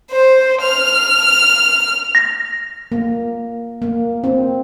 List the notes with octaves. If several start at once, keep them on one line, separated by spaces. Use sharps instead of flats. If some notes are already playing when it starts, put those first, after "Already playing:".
C5
F6
A#6
A#3
A#3
C4